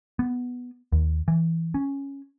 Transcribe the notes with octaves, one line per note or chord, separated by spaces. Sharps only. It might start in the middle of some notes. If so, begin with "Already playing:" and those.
B3
D#2
E3
C#4